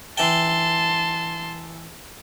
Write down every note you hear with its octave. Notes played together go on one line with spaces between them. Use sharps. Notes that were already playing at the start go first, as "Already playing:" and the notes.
E3 G5 A5 C6